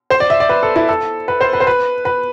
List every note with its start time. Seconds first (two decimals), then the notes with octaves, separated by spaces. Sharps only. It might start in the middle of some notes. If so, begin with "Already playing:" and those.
0.10 C5
0.20 D5
0.30 E5
0.40 D5
0.49 B4
0.63 A4
0.76 E4
0.89 A4
1.28 B4
1.41 C5
1.53 B4
1.60 C5
1.67 B4
2.05 B4